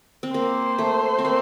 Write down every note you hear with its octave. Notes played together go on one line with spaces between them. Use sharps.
C4
A#3 C5
A3
C4
A#3